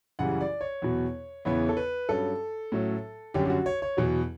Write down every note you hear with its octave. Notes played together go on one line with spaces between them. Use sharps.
F#2 C#3 E3 G3 F#5
D5
C#5
E2 B2 F#3
E2 C#3 E3 B3 C#5
A4
B4
G2 F#3 C#4 A4
A2 F#3 C#4
F#2 D3 G3 C#4 G4
G4
F#4
C#5
C#5
E2 B2 F#3